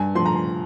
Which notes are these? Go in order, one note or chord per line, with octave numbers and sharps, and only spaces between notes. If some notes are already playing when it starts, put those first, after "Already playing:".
Already playing: G2 G#5
F3 C6
A#5
C6